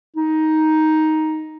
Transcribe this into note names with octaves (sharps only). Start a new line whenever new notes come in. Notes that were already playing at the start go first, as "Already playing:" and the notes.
D#4